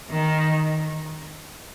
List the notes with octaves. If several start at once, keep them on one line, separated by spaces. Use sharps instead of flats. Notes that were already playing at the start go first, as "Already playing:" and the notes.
D#3